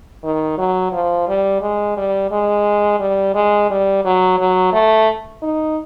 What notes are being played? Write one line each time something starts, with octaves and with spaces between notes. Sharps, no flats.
D#3
F#3
F3
G3
G#3
G3
G#3
G3
G#3
G3
F#3
F#3
A3
D#4